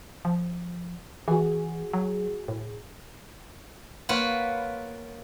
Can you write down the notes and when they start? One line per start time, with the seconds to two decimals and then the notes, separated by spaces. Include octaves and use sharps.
0.25 F3
1.28 E3 F#4 G#4
1.93 F#3
2.48 A2
4.09 A#3 F4 B4 C#5 F#5 B5